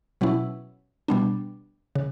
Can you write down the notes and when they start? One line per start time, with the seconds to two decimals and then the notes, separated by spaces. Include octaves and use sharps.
0.21 B2 F#3 C#4 E4
1.08 B2 G3 B3 D4
1.95 C#3